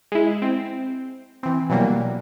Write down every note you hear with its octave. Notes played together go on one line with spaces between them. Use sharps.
G#3 E4
C4
E3 C4
B2 E3 F#3 G3 A#3